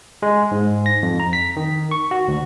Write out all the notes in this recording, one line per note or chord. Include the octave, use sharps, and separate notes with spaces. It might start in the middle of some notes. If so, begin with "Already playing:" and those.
G#3
G#2
A#6
F2
A#5
B6
D#3
C#6
F#4
D2